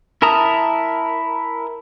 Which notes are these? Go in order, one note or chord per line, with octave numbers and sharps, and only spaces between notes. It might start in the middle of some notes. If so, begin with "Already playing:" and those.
E4 A#4 A5 A#5 D#6